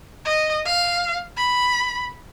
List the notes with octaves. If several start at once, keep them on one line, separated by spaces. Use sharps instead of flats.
D#5
F5
B5